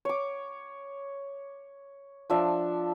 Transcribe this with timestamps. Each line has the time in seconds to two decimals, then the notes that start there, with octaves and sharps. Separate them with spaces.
0.05 C#5 D6
2.30 F3 D4 E5